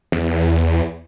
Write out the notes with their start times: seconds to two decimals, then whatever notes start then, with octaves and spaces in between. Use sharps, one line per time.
0.12 E2